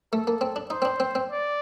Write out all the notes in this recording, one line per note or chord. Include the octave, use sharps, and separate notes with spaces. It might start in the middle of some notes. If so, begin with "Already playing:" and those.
A3 A4
A#3
C4
D4
D#4 C5
C4
D4
C4
C4
D5